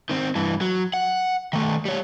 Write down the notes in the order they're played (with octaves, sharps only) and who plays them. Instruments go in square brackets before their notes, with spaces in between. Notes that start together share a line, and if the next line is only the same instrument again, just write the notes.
[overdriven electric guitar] D#3 C4
G2 E3
F#3
F#5
D#3 A3
G3 C#5